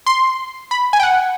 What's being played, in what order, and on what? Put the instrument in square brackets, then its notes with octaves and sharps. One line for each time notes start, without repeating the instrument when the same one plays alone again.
[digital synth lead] C6
B5
G#5
G5
F#5